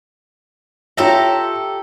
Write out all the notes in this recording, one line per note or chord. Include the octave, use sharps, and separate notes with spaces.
F4 G4 A4 C#5 E5 A#5